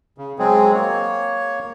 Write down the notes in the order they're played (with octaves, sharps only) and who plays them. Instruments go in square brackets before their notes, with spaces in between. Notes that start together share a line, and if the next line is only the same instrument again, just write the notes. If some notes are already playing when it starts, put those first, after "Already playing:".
[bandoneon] C#3
F#3 G#3 C4 G#4
A#3 C#5